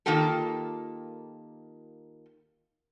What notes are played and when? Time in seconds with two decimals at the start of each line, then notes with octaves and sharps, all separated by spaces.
0.06 D#3 A#3 F4 G4 A4